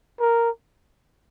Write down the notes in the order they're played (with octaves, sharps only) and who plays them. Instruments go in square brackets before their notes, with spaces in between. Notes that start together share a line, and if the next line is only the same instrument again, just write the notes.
[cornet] A#4